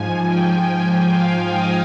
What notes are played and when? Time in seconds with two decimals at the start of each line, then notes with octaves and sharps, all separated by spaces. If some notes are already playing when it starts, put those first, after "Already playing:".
Already playing: G#2 F3 G#5
0.26 G5
1.10 F5
1.52 D#5